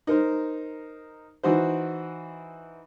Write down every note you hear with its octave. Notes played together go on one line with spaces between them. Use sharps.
D#4 A#4 C5
E3 D#4 F#4 C5